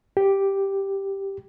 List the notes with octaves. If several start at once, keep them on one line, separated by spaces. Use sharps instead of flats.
G4